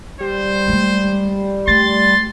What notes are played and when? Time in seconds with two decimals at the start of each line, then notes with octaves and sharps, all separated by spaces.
0.20 G3 C5
0.68 G#3 A3
1.68 A3 C6 A6